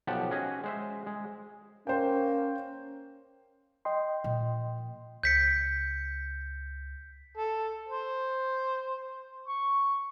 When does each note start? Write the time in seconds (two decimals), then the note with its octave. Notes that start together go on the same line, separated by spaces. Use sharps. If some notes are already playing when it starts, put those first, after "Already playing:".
0.07 B1 F3 B3 G4 F#5 A5
0.31 C#4 F#4 G#4 D#5
0.64 G#3 C5 E5
1.07 G#3
1.87 A#3 C#4 C5 G5
3.85 D#5 G5 C6
4.24 A#2 F3
5.23 C#2 G6 B6 C#7
7.37 A4
7.88 C5
9.48 C#6